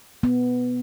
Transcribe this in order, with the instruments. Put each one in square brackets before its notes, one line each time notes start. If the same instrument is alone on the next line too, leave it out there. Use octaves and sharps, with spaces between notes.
[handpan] B3